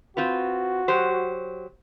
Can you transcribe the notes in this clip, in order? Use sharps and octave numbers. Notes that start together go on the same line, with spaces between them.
C4 F4 F#4 B4
F#3 G4 C5